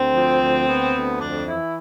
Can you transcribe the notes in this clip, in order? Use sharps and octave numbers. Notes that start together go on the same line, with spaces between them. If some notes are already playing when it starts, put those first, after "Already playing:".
Already playing: D2 C4
F3
D2
B3
D2
F2 D4
E3 E4